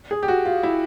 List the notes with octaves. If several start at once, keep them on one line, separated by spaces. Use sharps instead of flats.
G#4
G4
F#4
F4
E4